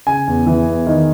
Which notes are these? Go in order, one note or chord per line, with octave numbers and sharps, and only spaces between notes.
C#3 G#5
E2
E3
E2
D#3